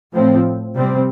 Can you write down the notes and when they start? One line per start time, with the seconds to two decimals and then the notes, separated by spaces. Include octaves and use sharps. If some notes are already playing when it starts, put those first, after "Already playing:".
0.14 A2 F3 C4
0.75 C3 G3 C4